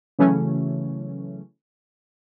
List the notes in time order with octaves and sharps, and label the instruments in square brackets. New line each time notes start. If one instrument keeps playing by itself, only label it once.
[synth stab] C#3 E3 F#3 A3 C#4